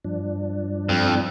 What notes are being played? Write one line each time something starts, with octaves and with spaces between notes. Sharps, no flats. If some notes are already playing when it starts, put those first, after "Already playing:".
G2 F3 D4
F2